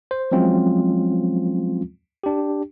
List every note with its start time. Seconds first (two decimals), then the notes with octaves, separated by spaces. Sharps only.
0.11 C5
0.32 F3 F#3 G#3 C4 C#4 F4
2.24 D4 G4